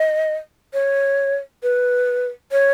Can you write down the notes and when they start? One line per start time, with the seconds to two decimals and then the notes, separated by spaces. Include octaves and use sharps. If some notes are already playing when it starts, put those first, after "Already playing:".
Already playing: D#5
0.74 C#5
1.63 B4
2.52 C#5